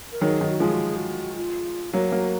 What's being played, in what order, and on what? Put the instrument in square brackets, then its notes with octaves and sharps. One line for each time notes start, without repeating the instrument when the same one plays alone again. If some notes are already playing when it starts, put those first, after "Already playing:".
[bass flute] A#4
[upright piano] D#3 F#3 [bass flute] G#4
[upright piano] D#3 F#3
[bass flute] F#4
[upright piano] F3 G#3 [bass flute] G#4
[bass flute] F#4
G#4
F#4
F4
[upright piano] F#3 A#3 [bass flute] F#4
[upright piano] F#3 A#3